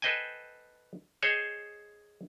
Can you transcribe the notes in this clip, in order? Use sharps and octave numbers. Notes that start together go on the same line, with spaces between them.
A4 B4 C5 D#5 G5 G#5
G#4 C5 C#5 D#5 G#5